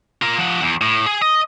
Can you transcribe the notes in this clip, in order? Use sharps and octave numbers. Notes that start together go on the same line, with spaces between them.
F4 A#4
F3 F#5
E2
A2
G#4 G#5
D#5